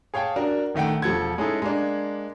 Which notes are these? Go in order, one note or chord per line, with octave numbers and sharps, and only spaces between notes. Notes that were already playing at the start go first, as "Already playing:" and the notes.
G#4 C#5 F5 G5 A5
D4 F#4 A#4 D5
A#1 D#3 A3 F#5 G5
E1 F3 A4 G#6
G#3 C#4 D#4 E4 G#4 A4
G#3 A#3 D4